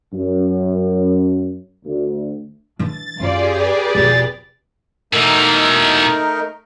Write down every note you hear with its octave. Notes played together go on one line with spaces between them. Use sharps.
F#2
D2
E3 D4 A6
F#2 F4 G4 G#4 D5
B4 D5
E1 F2 A6
B2 E3 A3 D#4 A#4